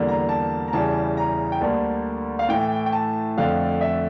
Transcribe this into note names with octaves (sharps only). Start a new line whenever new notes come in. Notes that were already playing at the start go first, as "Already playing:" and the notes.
Already playing: E2 D3 G3 A#3
A#5
A5
A#5
E2 C#3 E3 G3 A5
A#5
G5
D2 D3 G3 A#3 A5
F5
A2 E3 A3 G5
G5
A5
F2 D3 A3 F5
E5